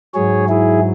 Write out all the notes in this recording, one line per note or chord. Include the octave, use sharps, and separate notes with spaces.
G#2 F#3 G#4 C#5
E4 G#4